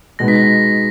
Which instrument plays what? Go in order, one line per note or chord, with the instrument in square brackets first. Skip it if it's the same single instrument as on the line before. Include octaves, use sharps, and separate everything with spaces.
[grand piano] B2 G#3 B3 D#4 [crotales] A#6
[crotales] B6
A#6